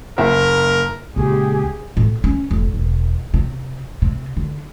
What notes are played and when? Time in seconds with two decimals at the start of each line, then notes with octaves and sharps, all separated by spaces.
0.18 F#1 A#4 E5
1.16 C#2 A#2 G4 G#4
1.97 A2
2.24 C#4
2.51 F1
2.74 E1
3.34 C3
4.02 C3
4.37 D3